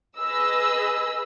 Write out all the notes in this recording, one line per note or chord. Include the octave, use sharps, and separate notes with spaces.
G#4 B4 D#5 E6